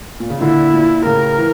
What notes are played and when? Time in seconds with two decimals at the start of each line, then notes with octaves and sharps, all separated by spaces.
0.20 A#2
0.30 C#3
0.41 A#2 D3 E4
0.73 A#2
1.05 A2 C#3 A#4
1.38 E3